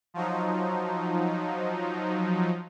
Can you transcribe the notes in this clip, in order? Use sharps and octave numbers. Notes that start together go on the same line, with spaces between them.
F3 F#3 D#4